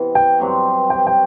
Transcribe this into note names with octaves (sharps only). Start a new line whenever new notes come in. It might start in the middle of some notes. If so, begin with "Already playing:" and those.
Already playing: C3 E3 B3
G5
G2 F#3 C4 G4
G5
G5